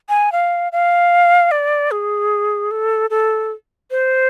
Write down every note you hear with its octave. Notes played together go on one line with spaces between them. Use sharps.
G#5
F5
F5
D5
G#4
A4
A4
C5